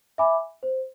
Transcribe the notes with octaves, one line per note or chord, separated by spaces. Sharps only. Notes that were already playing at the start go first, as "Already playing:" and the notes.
E5 G#5 B5 D6
C5